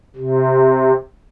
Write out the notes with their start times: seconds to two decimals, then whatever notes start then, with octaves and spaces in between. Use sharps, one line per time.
0.16 C3